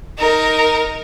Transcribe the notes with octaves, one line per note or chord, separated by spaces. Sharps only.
D#4 A#4